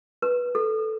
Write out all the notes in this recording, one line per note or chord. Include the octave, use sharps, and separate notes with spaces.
B4
A4